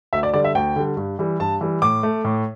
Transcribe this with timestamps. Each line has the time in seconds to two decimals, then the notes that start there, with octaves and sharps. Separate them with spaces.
0.13 D2 E5
0.23 D5
0.34 D3 G3 D5
0.44 E5
0.55 D2 G5
0.76 D3 G3
0.97 G2
1.19 E3 G3
1.40 G2 A5
1.61 E3 G3
1.82 A2 D6
2.03 A3
2.25 A2